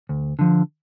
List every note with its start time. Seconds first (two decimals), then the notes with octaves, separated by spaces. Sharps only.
0.09 D2
0.39 D3 F3